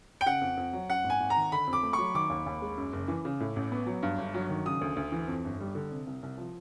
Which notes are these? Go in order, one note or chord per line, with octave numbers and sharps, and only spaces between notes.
G5
C#3 F#5
F2
F2
F#3
F#2 F#5
G#1
G#5
G#1
A#5
D#3
D3 B5
F2
D6
A3
F#3 C#6
D#3 D6
D#2
D#2
G#3
F#2
F#1
E3
C#3
A2
A1
B3
F#3
G2
G1
F#3
D#3
C#3 D#6
D2
D2
E3
F2
G1
G3
D3
C3
C2
C2
F3